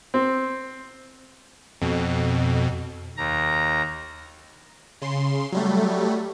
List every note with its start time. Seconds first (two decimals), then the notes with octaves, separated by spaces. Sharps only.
0.14 C4
1.82 F2 B2
3.17 D#2 A#5
5.02 C#3 C6
5.52 F#3 G3 A3